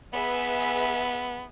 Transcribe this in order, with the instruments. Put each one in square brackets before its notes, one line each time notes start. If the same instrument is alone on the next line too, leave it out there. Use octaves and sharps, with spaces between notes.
[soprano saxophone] B3 [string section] G#4 B4 E5